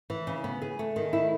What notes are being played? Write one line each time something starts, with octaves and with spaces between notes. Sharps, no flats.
E3
C#3
B3
G#4
A3
D#3
E4